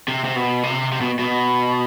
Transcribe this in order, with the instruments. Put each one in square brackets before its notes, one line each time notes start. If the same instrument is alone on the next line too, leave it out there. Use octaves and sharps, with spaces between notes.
[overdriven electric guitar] C3
C3
B2
C3
C3
B2
B2